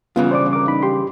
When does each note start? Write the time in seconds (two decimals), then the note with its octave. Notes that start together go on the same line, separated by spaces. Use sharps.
0.16 G2 C#3 E3 B3 F4
0.31 C5 D5 D6
0.53 A#4 D6
0.67 D#4 B5
0.83 G4 C6